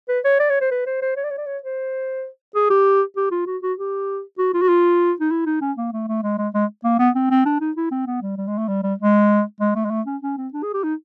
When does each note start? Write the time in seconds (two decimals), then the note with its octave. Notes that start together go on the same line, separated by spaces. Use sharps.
0.09 B4
0.25 C#5
0.40 D5
0.50 C#5
0.61 C5
0.71 B4
0.86 C5
1.02 C5
1.16 C#5
1.24 D5
1.31 C#5
1.38 D5
1.46 C#5
1.63 C5
2.55 G#4
2.70 G4
3.17 G4
3.31 F4
3.46 F#4
3.63 F#4
3.78 G4
4.38 F#4
4.54 F4
4.62 F#4
4.68 F4
5.20 D#4
5.31 E4
5.46 D#4
5.61 C#4
5.77 A#3
5.93 A3
6.08 A3
6.23 G#3
6.38 G#3
6.54 G#3
6.84 A#3
6.99 B3
7.15 C4
7.31 C4
7.46 D4
7.60 D#4
7.77 E4
7.91 C4
8.07 B3
8.22 G3
8.37 G3
8.47 G#3
8.58 A3
8.68 G3
8.83 G3
8.99 G#3
9.60 G#3
9.75 A3
9.85 G#3
9.91 A3
10.06 C#4
10.22 C#4
10.37 C4
10.53 D4
10.63 G#4
10.74 G4
10.83 D#4